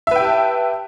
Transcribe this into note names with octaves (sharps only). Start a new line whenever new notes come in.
G4 B4 E5 G5 A5